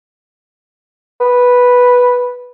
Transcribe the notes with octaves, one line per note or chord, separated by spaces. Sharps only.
B4